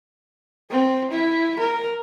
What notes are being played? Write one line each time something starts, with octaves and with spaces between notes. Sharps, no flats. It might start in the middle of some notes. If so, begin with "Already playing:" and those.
C4
E4
A#4